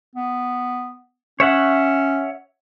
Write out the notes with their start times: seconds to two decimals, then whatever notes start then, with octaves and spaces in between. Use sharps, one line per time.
0.15 B3
1.40 C#4 C#5 E5 F#5